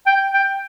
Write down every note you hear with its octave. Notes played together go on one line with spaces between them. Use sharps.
G5
G5